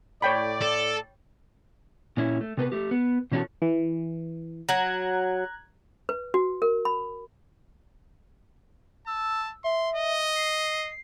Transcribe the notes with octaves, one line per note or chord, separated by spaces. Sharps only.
A2 C#5 D5 G5 B5
A4
A#2 C#4 E4
A3
C3 B3 A4 B4
A3 G4
B3
B2 E3 C#4 D4 F#4 A4
E3
F#3 A#5 F#6 G#6
B4
F#4
A#4
B5
A5 E6
E5 C6
D#5
C7